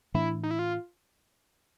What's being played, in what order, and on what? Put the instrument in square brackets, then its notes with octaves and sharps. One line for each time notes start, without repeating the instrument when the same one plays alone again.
[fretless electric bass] A2 E3 A3 D4 [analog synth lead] E4
[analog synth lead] D#4
E4
F4